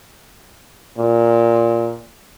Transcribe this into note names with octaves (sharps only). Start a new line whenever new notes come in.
A#2